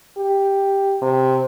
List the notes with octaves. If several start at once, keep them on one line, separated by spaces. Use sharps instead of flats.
G4
C3